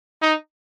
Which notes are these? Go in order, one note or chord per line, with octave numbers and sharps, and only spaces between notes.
D#4